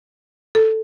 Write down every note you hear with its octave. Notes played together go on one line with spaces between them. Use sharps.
A4